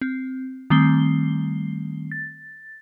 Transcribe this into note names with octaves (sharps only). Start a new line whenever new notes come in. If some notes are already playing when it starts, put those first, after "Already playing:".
C4
D#3 G3 A3 C4 C7 G7
A6